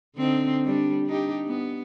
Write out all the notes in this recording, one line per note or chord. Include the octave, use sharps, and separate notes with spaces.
D3 C4 D#4
G3 D4
D4 D#4 G4
B3